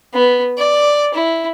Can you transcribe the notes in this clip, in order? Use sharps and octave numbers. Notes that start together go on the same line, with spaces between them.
B3
D5
E4